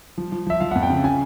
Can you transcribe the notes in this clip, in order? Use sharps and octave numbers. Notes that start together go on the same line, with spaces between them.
F3
F3
F3 E5
F3 F5
F2 F#5
G5
C#3
C#3 G#5